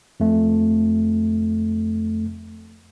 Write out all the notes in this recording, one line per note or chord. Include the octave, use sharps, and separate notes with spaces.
F2 A3